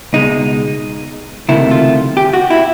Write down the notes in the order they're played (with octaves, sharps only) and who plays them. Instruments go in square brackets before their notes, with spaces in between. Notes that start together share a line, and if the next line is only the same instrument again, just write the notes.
[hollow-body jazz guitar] C#2 B2 G#3 D#4
C#2 C3 D#3 F#3 A3 E4
F4
G4
F#4
E4